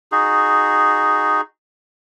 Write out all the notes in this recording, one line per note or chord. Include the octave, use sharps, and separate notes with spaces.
D#4 F#4 G#4